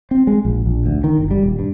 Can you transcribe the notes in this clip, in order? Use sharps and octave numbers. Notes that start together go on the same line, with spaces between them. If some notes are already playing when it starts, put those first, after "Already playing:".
C4
G#3
A#1
A#1
D2
D#3
G1
G3
D#1
G2